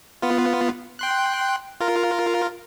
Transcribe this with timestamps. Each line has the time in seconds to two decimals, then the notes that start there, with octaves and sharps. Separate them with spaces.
0.22 B3 F4
0.99 G5 C6 F#6
1.80 F4 A#4